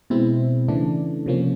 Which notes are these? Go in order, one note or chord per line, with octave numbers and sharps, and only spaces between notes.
B2 G#3 C4 E4
C#3 E3 A3 D4
C3 F3 A#3 C#4